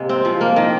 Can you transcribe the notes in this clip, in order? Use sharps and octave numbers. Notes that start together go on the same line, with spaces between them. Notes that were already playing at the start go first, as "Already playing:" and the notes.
Already playing: C3 G#3 A#3
C4
F3
A#3
D#3